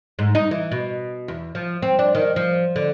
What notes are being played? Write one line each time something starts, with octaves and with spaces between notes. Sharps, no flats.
G#2
D#4
E3
B2
E2
F3
C4
D4
D#3
F3
D3